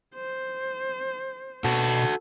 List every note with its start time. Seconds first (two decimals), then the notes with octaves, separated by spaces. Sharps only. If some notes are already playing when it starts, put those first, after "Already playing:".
0.15 C5
1.64 B2 F#4 A4